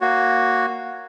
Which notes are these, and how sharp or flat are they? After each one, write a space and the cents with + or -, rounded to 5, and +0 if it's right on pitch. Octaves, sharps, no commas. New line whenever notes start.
A#3 +0 F#4 +0 C#5 +0